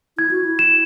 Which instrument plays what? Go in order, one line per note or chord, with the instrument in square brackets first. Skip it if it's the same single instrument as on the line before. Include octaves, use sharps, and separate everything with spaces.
[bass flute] E4 [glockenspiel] G#6
[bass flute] F#4
E4
[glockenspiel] E7